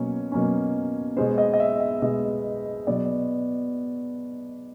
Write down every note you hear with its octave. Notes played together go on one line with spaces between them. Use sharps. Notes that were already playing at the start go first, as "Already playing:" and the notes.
Already playing: B2 F#3 A#3 C#4 C#5
B2 F#3 A#3 C#4
B2 G#3 B3 C5
D#5
D#5
E5
E5
B2 G#3 B3 D#5
B2 F#3 B3 D5